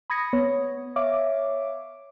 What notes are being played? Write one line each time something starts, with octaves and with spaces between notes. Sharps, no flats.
B5 D#6 G#6 A#6 C#7
B3 C#5
C#5 E5 F5 D6